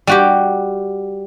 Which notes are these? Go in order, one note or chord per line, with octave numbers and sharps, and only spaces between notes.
G3 F#4 G4